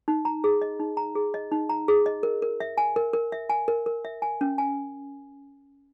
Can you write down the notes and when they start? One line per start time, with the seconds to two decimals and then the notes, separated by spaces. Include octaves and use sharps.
0.08 D#4
0.25 A#5
0.44 G#4
0.62 D#5
0.79 D#4
0.97 A#5
1.15 G#4
1.34 D#5
1.52 D#4
1.69 A#5
1.88 G#4
2.06 D#5
2.23 A#4
2.42 A#4
2.60 E5
2.78 G#5
2.96 A#4
3.13 A#4
3.32 E5
3.49 G#5
3.68 A#4
3.86 A#4
4.05 E5
4.22 G#5
4.41 C#4
4.58 G#5